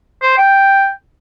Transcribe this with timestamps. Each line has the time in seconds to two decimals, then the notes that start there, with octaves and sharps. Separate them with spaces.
0.22 C5
0.38 G5